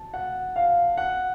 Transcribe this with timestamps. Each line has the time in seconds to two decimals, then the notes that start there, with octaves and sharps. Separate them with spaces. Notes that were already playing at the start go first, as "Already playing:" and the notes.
Already playing: A5
0.14 F#5
0.56 F5
0.97 F#5